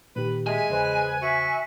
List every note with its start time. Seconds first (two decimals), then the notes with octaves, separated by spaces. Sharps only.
0.16 A#2 D#3 G4 B4
0.47 G#3 E5 G#5
0.70 E2 C#3 B4 C5
1.22 F#4 E5